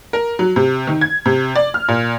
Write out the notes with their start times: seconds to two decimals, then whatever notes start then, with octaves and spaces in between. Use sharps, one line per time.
0.13 A#4
0.39 F#3
0.56 C3
0.87 D#3
1.01 G#6
1.26 C3
1.56 D5
1.74 F6
1.88 A#2